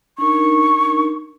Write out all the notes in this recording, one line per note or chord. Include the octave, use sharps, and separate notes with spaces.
D4 D#4 A#4 C#6